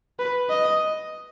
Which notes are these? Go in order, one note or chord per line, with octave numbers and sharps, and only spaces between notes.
B4
D#5